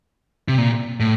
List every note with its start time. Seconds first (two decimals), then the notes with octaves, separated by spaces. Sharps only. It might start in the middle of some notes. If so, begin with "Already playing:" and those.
0.48 C3
0.58 A#2
1.00 A2